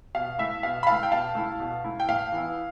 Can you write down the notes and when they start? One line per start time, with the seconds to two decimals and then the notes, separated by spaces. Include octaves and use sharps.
0.15 B2 F5
0.38 A3 E4 E5
0.63 B2 F5
0.83 B5
0.87 A3 E4 F5 A5
1.03 G5
1.12 B2 F5 A5
1.35 A3 E4
1.60 B2
1.84 A3 E4
2.00 G5
2.08 A2 F5
2.32 E3 B3 E4